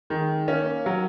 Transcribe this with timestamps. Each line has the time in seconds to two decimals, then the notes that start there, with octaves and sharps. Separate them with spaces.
0.10 D#3 G#3
0.48 A#3 C#4
0.86 D#3 F#3